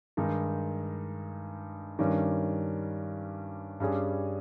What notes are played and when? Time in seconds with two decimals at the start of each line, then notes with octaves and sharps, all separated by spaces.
0.17 G2 D#3 G#3 D#4
1.99 G2 D#3 G3 C#4
3.80 G2 G3 C#4 G#4